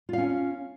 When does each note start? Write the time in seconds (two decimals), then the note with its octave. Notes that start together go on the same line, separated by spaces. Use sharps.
0.09 F4
0.13 F5
0.18 C#4